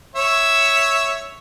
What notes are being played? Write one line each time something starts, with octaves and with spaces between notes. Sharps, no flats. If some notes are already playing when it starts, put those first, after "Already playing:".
C#5 E5